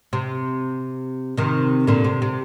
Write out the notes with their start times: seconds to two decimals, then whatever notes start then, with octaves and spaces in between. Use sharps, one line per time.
0.13 C3
1.37 C3 D#3
1.87 A#2 D3
2.04 C3
2.22 C3